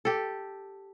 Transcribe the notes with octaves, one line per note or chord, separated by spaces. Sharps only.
G4 A4